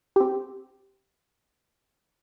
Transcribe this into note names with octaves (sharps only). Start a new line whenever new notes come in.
C4 G4